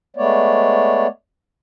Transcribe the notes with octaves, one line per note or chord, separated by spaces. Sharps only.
G#3 A3 B3 C#5 D5